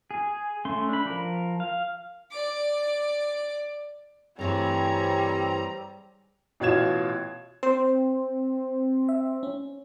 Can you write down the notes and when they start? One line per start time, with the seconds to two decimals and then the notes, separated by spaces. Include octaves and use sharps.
0.11 G#4
0.65 A3 C#4 C6
0.89 D4 B5
1.05 F3 A#4
1.60 F5
2.31 D5 D6
4.39 G2 E3 G3 A3 C4 G#4 C#5 A#5
6.60 A1 B2 F4 F5 G#6 E7
7.63 C4 C5
9.09 E5
9.43 C#4